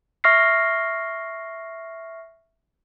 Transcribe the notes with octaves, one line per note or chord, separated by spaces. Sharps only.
E5 C#6 F6 A#6 C7